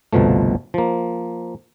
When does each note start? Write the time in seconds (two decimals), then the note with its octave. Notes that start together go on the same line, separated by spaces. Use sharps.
0.13 G1 C2 B2 F3 A3
0.74 F3 A#3